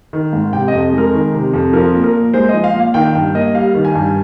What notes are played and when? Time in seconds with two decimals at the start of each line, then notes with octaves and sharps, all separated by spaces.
0.13 D#3
0.33 G#2
0.53 C3 G5
0.68 D#5
0.73 F2
0.93 G#3 A#4
1.14 D#3
1.34 C3
1.53 F2
1.73 F3 A#4
1.94 A#2
2.04 A#4
2.14 A#2
2.34 G#3 C5
2.49 F3 D#5
2.64 F5
2.74 A#2
2.80 F5
2.94 D#3 G5
3.15 G2 G5
3.35 A#3 D#5
3.55 G3 F5
3.75 D#3
3.85 G#5
3.95 G2